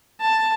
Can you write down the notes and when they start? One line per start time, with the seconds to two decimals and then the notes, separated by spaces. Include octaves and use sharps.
0.21 A5